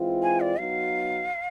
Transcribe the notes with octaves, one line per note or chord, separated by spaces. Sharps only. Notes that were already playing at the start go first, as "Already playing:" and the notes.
Already playing: E3 G#3 C4 F4
G#5
D5
F#3 B3 D#4 F#4 F5